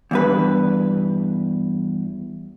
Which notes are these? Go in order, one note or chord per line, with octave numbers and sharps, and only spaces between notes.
E2 G2 B4